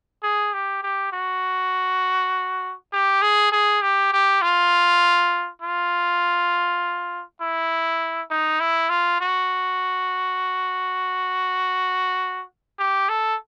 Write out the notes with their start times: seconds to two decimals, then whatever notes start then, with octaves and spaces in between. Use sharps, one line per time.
0.23 G#4
0.54 G4
0.83 G4
1.13 F#4
2.93 G4
3.22 G#4
3.52 G#4
3.82 G4
4.13 G4
4.42 F4
5.62 F4
7.41 E4
8.31 D#4
8.60 E4
8.90 F4
9.21 F#4
12.79 G4
13.09 A4